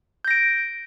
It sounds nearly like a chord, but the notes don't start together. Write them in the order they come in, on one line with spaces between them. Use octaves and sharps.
G6 A#6 D7